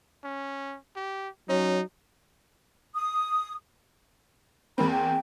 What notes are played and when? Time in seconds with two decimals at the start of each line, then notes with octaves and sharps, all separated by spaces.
0.24 C#4
0.96 G4
1.49 F#3 C#4 D#4
2.95 D#6
4.78 E2 A#3 C4 B5
4.91 G5